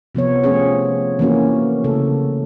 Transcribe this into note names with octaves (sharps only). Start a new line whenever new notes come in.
C3 F3 B3 C#5
F3 A3 C4 C#4 G#4 C#5
E3 F3 A#3 C#4 F#4
C#3 A3 A4